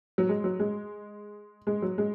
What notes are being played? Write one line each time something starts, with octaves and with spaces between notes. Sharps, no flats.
F#3
G#3
F#3
G#3
G#3
F#3
G#3